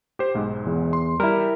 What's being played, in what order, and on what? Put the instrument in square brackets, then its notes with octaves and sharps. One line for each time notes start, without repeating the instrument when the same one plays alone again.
[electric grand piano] G4 C5
B1 G#2 G#3
[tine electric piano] E2
[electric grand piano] C6
[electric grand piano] G3 [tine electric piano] E4 A#4